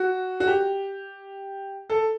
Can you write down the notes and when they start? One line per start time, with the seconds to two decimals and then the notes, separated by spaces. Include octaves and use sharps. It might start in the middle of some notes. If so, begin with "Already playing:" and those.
Already playing: F#4
0.40 F#4
0.47 G4
1.90 A4